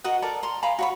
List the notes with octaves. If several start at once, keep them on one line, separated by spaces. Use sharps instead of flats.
F#4 A#4 D#5 F#5
A4 A#4 D5
A#5 C6
F5 G#5 A#5 B5
F#4 C#5 B5